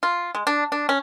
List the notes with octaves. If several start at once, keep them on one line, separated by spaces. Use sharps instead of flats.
F4
G#3
D4
D4
C#4